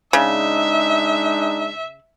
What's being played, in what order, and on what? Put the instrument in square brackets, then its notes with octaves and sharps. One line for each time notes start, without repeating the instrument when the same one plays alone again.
[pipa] C#3 [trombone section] G#3 D4 D#4 [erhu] E5